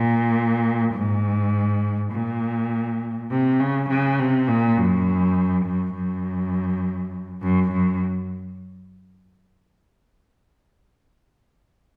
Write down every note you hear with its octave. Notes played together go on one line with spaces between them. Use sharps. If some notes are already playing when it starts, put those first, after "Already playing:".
Already playing: A#2
G#2
A#2
C3
C#3
C#3
C3
A#2
F#2
F#2
F#2
F#2
F#2